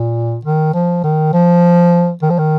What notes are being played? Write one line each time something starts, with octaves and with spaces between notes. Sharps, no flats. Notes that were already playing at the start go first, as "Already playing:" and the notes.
Already playing: A#2
D#3
F3
D#3
F3
D#3
F3
D#3